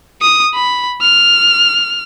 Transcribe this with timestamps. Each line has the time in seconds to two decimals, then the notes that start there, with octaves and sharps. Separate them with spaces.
0.22 D#6
0.55 B5
1.02 F6